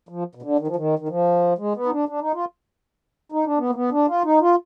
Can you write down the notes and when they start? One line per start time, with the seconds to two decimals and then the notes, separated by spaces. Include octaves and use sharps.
0.09 F3
0.35 B2
0.42 D3
0.59 D#3
0.67 F3
0.76 D#3
0.99 D#3
1.09 F3
1.58 G#3
1.76 B3
1.86 D#4
1.92 D4
2.09 D4
2.21 D#4
2.34 F4
3.32 D#4
3.46 D4
3.58 B3
3.70 A#3
3.75 B3
3.91 D4
4.08 F4
4.24 D#4
4.41 F4